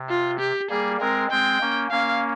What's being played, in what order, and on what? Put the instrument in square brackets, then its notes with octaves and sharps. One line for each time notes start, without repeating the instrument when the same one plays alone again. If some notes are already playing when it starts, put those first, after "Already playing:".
Already playing: [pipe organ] C3
[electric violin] F4
G4
[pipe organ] G3 A#3 [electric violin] G#4
[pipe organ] G#3 C4 [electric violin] A#4
[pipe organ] G#3 C4 [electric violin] G5
[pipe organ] A#3 C#4
[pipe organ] A#3 C#4 [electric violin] F5